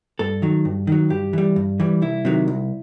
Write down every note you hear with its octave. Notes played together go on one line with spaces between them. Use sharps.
G2 A4
D#3 F#3
G2
D#3 F#3
G2 G4
E3 G3
G2
E3 G3
C2 E4
C3 D#3 F#3
C2